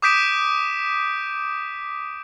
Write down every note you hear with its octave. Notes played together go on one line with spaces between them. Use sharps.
D6 D#6 G6 B6 D7 E7